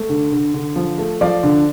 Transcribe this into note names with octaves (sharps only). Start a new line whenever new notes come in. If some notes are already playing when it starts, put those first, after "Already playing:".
Already playing: A3
D3
D3
D3
F3
A3
F3 D5 F5
D3